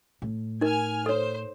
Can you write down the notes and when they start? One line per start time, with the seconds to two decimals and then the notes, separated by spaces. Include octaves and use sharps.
0.22 A2
0.61 D#4 A#4 G#5 F6
1.06 A4 C5 C#5